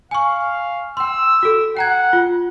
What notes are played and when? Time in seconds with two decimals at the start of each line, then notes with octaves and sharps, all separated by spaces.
0.11 F5 G#5 C#6
0.97 G5 C6 E6
1.43 F#4 A4
1.77 F#5 G5 A#5 G#6
2.13 F4